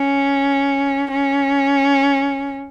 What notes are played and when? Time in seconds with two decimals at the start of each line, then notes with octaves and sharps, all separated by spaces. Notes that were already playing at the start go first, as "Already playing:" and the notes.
Already playing: C#4
1.12 C#4